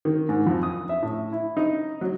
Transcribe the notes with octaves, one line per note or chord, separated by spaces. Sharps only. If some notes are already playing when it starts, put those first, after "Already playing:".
D#3
G#2
F2
D#6
E5
A2
E4
D#4
F#3